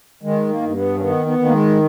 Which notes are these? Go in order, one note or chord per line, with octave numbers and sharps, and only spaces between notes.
D#3 G#3
A#3
G2
A#3
B3
C#4
D#3 B3
B3
D#3
A#3
G#3